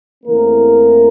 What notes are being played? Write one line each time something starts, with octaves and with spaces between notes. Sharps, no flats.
E2 C#3 E3 A3 A#3 C4 A#4